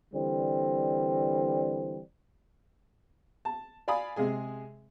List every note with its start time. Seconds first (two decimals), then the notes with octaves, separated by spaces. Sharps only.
0.14 D3 E3 G3 C4
3.45 A5
3.88 D5 F5 G#5 B5 D#6
4.16 C3 G#3 G#4 G#5